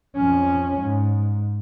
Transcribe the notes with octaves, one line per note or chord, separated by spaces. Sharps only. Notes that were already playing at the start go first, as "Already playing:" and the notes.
F2 C#4
G#2